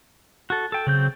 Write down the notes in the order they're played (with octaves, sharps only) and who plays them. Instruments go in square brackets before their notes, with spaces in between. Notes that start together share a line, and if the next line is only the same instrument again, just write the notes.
[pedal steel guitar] F#4 A4
A4 G5
[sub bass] C#3 [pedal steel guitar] F#3 C4 G6